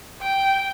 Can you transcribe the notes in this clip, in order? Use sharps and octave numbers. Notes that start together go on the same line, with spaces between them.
G5